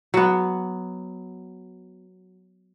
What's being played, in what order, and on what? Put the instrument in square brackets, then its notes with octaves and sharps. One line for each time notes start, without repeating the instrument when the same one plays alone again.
[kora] F#3 B3